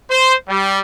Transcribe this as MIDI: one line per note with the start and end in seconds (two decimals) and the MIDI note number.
0.11 0.34 72
0.49 0.79 55